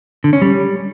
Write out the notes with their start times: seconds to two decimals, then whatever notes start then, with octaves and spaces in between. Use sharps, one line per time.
0.24 D3
0.33 C#4
0.42 G3